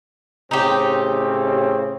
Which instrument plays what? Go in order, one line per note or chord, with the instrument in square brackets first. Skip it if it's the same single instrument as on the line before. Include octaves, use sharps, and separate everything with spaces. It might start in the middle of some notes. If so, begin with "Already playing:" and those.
[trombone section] A2 C#3 C4 [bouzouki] D#4 G4